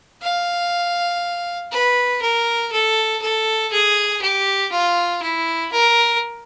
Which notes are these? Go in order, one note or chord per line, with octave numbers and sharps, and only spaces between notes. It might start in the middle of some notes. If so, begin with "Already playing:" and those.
F5
B4
A#4
A4
A4
G#4
G4
F4
E4
A#4